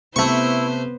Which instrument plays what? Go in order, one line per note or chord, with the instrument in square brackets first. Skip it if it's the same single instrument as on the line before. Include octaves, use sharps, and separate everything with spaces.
[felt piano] C3 [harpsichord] A3 C#6 [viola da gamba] B3 B4 C5 [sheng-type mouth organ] E4